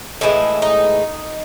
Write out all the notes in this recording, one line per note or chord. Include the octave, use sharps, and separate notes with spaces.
A2 E3 G#3 E4
D#4